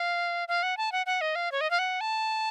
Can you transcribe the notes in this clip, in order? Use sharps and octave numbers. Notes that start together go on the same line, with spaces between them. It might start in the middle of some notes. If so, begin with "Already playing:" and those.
Already playing: F5
F5
F#5
A5
F#5
F#5
D#5
F5
C#5
D#5
F5
F#5
A5